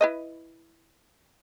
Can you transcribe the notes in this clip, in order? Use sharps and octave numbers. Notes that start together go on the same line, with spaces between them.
E4 B4 D#5